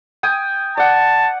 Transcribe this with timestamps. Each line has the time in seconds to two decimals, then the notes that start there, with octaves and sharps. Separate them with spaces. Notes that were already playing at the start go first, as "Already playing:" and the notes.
0.23 G5 G#5 D#6
0.77 D5 F#5 A5